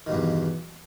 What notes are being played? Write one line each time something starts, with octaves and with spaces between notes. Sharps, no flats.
E2 G2 B2 D#3